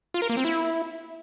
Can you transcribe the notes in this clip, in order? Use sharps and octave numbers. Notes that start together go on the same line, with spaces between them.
F4
A#4
A#3
C4
E4